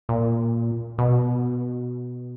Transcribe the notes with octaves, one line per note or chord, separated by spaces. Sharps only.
A#2
B2